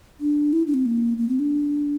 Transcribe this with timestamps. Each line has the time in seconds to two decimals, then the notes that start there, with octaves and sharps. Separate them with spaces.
0.20 D4
0.53 E4
0.67 D4
0.74 C4
0.86 A#3
1.18 A#3
1.29 C4
1.39 D4